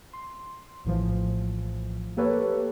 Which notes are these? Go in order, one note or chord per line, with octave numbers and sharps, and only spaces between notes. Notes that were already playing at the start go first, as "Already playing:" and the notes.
C6
A#1 A2 E3 F3
A#3 G4 A4 B4 C#5